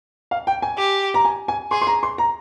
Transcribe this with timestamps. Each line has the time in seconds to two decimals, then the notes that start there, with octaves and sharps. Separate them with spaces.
0.31 F5
0.47 G5
0.62 G#5
0.78 G4
1.14 A#5
1.25 G#5
1.48 G#5
1.71 G#4 C6
1.82 C6
1.87 A#5
2.03 C6
2.18 A#5